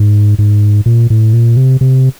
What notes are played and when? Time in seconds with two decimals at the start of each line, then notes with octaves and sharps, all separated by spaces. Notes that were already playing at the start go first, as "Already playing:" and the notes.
Already playing: G#2
0.39 G#2
0.86 A#2
1.10 A2
1.33 A#2
1.57 C3
1.81 C3